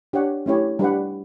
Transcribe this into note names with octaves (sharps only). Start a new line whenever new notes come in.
D4 G4 C#5 F#5
A3 C#4 E4 G4 C#5
G3 D4 G4 B4 F#5